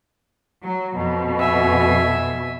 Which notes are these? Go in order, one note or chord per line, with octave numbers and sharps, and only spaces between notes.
F#3
F2 B2
E5 G#5